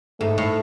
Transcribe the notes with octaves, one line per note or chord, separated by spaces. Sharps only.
G#2 A3
A2